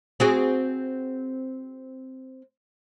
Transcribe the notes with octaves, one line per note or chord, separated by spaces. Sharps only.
C4 F#4 G#4